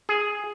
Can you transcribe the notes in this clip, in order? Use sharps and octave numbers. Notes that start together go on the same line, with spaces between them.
G#4